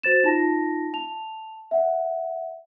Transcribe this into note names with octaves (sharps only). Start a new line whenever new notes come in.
F#4 C5 A6 E7
D#4 F4 A5 A#6
A5 F7
E5 F#5